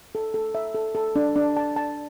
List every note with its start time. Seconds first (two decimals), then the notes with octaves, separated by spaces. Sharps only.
0.15 A4
0.34 A4
0.55 E5
0.75 A4
0.95 A4
1.16 D4
1.36 D4
1.57 A5
1.76 A5